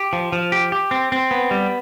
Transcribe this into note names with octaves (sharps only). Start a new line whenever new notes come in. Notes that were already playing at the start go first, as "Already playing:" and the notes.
Already playing: G4
F3
F3
G4
G4
C4
C4
B3
G3